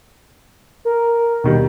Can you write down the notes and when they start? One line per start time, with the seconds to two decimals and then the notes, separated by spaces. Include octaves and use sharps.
0.85 A#4
1.44 D#2 B2 D#3 G3